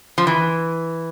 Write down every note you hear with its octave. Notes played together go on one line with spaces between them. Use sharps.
F3
E3